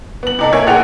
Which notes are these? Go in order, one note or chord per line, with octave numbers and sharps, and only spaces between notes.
B3 F#7
C3 D#4 A4
A#3 C#5 E5 G#5 G#6
F1 A#1 G#4 F#5 G5 F7